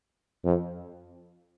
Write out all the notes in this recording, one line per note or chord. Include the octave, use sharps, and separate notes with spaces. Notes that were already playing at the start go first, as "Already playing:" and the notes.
F2